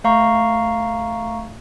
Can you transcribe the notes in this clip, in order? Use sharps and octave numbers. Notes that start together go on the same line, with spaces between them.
A3 F5 A#5 C#6